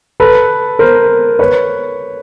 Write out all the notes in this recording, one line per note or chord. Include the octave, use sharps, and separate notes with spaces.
A4 B4
A#4 C5
B4 C#5